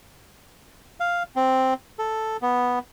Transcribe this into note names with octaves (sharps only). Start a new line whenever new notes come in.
F5
C4
A4
B3